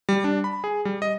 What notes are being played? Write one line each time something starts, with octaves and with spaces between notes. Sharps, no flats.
G3
D4
B5
G#4
G3
D#5